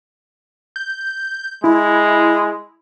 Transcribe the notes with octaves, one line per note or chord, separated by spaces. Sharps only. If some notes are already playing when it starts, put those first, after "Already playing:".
G6
G#3 E4